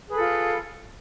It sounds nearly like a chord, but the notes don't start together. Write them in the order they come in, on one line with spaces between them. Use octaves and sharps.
G#4 B4 A4 F4